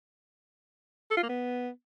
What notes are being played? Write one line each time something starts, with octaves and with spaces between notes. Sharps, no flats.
A4
F4
A#3
B3